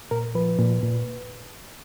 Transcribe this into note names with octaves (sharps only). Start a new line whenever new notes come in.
A#2 A#4
F3 B4
A#2
A#2